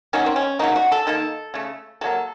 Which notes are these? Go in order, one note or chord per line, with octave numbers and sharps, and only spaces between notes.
D#3 F#3 A#3 C#4
C4
C#4
C#3 F#3 A#3 D#4
F#4
A4
D#3 A#3 A4
C#3 A3
C3 F#3 A#3 A4